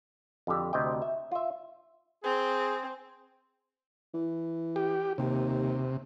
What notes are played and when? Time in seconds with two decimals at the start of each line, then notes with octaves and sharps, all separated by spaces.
0.47 F2 D3 G4
0.73 D2 C3 D#5 G5
1.02 E5
1.32 F4 E5
2.24 C4 G#4
4.14 E3
4.76 G4
5.18 D#2 C3